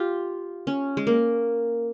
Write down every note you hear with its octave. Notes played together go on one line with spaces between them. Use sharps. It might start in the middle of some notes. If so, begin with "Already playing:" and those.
Already playing: F4 G4
C#4
G#3
A#3